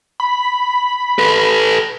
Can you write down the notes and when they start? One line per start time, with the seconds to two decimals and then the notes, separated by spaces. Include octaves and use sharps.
0.20 B5
1.19 A4 B4